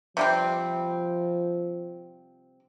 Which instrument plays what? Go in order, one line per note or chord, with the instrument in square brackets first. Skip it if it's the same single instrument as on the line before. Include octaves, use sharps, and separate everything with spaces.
[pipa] C3 G3 C4 [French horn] F3